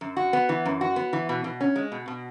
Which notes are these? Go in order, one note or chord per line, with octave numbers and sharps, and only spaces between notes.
F#2
F#4
B3
E3
F#2
F#4
B3
E3
B2
B2
C#4
G#3
B2
B2